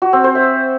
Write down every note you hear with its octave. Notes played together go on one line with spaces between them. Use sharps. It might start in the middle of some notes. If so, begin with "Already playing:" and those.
F#4
C4
C5
E5